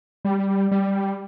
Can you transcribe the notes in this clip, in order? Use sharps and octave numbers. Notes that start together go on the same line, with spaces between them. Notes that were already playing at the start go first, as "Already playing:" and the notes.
G3
G3